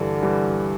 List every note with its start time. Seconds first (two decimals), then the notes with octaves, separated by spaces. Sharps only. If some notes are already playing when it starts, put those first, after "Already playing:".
Already playing: G2 D3 E3 G3
0.22 E3 G3